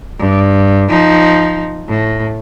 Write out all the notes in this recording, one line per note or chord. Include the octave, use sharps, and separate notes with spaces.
G2
F3 D#4
A2